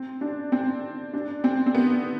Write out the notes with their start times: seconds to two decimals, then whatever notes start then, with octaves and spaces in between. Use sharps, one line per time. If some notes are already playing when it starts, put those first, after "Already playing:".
Already playing: C4
0.21 D4
0.52 C4
1.13 D4
1.44 C4
1.66 C4
1.75 B3